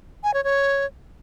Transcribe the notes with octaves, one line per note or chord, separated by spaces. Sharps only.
G#5
C#5
C#5